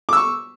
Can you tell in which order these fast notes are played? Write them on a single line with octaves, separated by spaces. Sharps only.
D6 E6 C#6